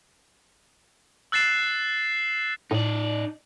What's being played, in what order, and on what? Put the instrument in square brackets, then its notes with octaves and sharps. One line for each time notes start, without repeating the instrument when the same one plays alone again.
[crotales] E6 F#6 A6 C7 E7
[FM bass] A2 [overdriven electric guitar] D#4 D5